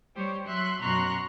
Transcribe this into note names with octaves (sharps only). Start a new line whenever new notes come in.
G3 G4 C5 C#5
F#3 E5 C6 F#6
F#2 B2 A#5 C6 C#6 F#6